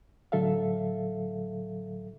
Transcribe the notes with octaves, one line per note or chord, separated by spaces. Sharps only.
A2 D3 F#3 A4 E5 F5